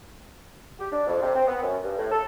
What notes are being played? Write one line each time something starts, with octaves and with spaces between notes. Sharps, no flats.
G4
D4
F2
C3
C4
B3
F#2
G2
A2
A4